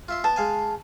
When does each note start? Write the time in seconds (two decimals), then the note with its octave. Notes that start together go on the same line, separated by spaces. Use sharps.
0.08 F4 E5 C6
0.24 B3 A5
0.36 G#3 F5 G#5